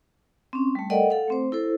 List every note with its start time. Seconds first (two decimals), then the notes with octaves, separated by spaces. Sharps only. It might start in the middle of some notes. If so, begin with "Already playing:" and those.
0.53 C4 C#4
0.75 G3 A3
0.90 A4 A#4 D5 D#5 F#5 G5
1.10 A4 F5 F#5
1.28 A3 C4 C5
1.52 E4 A4 C5